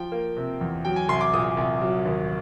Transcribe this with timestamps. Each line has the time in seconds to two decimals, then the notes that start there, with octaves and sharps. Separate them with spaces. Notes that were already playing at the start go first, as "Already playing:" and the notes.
Already playing: F3 G5
0.12 A#3
0.37 C3
0.61 E2
0.85 F#3 G5
0.96 G#5
1.08 C2 C6
1.21 D6
1.33 A#2 D#6
1.57 C2
1.82 F#3
2.06 D#2